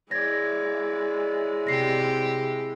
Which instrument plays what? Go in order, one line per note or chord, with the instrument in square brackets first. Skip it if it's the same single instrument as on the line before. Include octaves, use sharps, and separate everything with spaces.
[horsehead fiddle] G#3 E4 [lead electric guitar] C#5 D5 [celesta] G#6 A#6
[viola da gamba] C3 G4 [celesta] A#6 C7